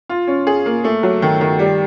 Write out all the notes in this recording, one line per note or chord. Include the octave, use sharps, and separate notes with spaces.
F4
C#4
G#4
A#3
A3
F#3
D#3
D#3
G3